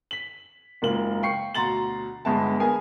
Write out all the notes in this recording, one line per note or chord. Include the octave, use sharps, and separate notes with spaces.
B6 F#7
F#1 G#2 A#3 F4 F#7
F5 G5 C#6 C7 C#7
D2 B2 A#5 C6 A6 F#7
G1 G#3 B3 E5 A5
B3 G#4 A#4 G#5